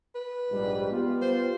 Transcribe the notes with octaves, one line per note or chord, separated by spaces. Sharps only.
B4
A#1 G#2 G3
B3 F4 G4
C5